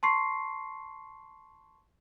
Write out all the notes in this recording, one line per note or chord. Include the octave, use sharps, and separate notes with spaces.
A5 C6 C#6 C7